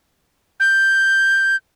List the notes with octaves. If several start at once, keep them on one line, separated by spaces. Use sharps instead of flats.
G6